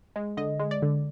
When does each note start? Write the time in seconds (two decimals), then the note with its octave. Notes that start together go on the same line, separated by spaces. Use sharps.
0.16 G#3
0.37 D3 D#5
0.60 G#3
0.71 D5
0.82 D3